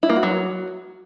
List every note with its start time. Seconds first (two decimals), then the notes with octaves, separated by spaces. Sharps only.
0.03 E4
0.10 A#3
0.16 F#4
0.23 F#3